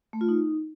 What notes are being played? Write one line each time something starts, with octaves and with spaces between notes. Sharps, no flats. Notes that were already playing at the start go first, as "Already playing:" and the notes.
A3
F4
D#4